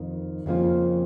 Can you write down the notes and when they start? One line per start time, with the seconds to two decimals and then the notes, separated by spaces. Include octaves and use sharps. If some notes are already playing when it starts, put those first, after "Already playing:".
Already playing: F2 D#3
0.46 F2 C#3 F3 A#3 F4